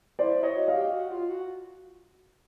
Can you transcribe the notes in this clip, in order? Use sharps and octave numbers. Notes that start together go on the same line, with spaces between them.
E4 C5 D5
E4
C#5 D#5
F#4
D#5 F5
G4
F#4
F4
F#4